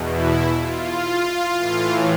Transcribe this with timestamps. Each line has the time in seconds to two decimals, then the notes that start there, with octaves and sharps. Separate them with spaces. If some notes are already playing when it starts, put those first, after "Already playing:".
Already playing: E2 B2
0.11 E4
0.58 F4
1.52 E3
1.58 A2